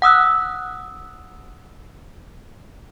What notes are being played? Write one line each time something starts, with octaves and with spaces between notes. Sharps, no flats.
F#5 D#6 E6 F#6